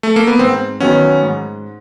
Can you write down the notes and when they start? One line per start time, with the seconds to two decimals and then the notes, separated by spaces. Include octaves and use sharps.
0.03 A3
0.16 A#3
0.27 B3
0.39 G#2 C4
0.80 D#3 F#3 B3 C#4
1.23 G#2